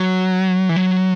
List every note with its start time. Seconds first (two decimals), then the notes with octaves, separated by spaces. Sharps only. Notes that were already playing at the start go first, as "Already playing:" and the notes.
Already playing: F#3
0.69 E3
0.76 F#3